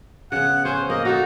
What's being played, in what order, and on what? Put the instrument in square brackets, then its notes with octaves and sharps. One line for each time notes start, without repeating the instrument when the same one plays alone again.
[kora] C#3 B3 [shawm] F#5
[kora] C#4 [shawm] C5
[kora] A#3 [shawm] D#5
[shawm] D#4 [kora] F#4 A4